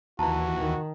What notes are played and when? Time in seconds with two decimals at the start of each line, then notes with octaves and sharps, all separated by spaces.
0.19 D#2 E3 F#4 A5 A#5
0.59 D#3